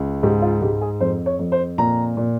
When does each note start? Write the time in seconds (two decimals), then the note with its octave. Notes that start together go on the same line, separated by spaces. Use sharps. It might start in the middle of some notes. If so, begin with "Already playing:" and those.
Already playing: C#2
0.23 G#2 G4
0.42 F4
0.62 G#2 G4
0.82 G#4
1.00 F2 C5
1.26 C#5
1.39 F2
1.52 C5
1.78 A#2 A#5
2.17 A#2